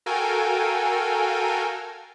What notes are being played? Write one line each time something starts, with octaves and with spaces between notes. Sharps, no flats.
F#4 A4 A#4 F5 G5 G#5